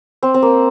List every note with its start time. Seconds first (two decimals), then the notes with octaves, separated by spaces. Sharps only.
0.23 C4
0.34 C4
0.42 A#3